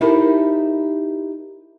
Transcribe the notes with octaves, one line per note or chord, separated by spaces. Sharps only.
D#4 E4 G4 A4 A#4 C5